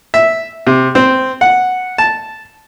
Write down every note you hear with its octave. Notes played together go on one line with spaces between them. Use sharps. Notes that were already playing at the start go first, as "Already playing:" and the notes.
E5
C3
C4
F#5
A5